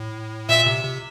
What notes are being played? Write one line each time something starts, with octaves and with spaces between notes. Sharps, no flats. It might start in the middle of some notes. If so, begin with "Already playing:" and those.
Already playing: A2
A#2 E5
C3
C3